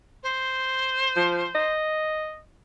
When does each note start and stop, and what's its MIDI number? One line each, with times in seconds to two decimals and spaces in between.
0.23 1.73 72
1.16 1.45 53
1.55 2.39 75